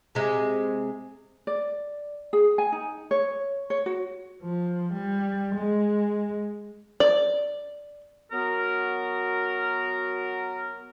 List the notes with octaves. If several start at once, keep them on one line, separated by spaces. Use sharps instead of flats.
C3 G#3
D5
G#4
G#5
D#4
C#5
C#5
F#4
F3
G3
G#3
D5
F#3 B3 F#4 A#4